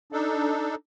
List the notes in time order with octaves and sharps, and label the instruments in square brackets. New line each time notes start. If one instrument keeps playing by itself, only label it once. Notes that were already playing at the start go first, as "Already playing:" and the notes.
[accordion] D4 D#4 A4